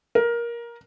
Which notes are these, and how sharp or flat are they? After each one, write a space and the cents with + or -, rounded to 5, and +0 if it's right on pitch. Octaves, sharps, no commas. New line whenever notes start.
A#4 +15